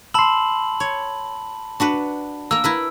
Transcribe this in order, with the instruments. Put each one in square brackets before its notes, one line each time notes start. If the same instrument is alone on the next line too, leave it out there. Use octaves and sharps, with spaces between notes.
[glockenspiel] A5 B5 F#7 [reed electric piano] C6 E6
[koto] C#5
D4 F#4 B4
[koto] A#3 A#4 [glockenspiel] E6
[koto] E4 A#4 B4